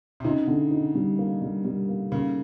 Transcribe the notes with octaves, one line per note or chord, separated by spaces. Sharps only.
C3
C#3 D#4
D3
D#4
G3
A#3
G3
G3
A#3
C#3 A#3